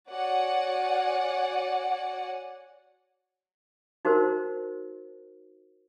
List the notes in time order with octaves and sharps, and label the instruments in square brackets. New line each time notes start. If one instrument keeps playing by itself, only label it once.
[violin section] F#4 C#5 D5 F#5 G#5
[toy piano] D#4 F#4 A#4 C5